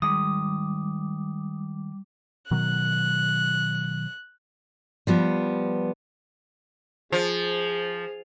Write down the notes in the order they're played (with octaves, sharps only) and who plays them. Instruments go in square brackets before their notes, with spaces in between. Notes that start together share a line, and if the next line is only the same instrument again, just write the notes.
[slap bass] D#3 G#3 [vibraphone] G3 D6 [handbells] D#6
[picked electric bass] B2 D#3 F#3 [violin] F#6
[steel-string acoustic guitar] F3 G3 B3
[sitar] F3 [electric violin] G#4